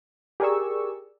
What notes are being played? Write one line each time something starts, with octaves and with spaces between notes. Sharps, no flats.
G4 G#4 A#4 D5 C#6 E6